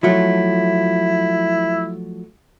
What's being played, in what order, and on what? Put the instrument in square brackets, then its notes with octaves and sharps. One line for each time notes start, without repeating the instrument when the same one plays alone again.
[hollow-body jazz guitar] F3 F#3 A3 [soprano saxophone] E4